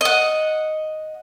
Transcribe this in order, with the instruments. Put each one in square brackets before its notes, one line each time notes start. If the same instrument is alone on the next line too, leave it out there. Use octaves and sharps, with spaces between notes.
[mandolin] D#5 F#5